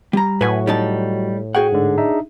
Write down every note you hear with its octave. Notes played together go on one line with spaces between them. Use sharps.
G3 A#5
A2 F#3 F#4 B4 G#5
G3 D#4 A5
F#4 G#4 F#5 G5
G#2 D3
D4 D#4 E5